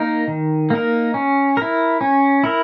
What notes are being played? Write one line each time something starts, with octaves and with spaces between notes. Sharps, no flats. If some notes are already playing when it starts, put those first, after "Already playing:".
Already playing: A#3 D#4 A#4
D#3
A#3 D#4 A#4
C#4
E4 A#4
C#4
E4 A#4